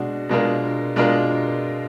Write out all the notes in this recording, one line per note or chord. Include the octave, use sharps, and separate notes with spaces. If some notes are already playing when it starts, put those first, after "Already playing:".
Already playing: B2 G#3 D4 F#4
B2 G#3 D4 F4 A#4
B2 G#3 D4 F4 A#4